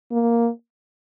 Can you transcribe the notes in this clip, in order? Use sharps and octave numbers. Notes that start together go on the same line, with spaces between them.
A#3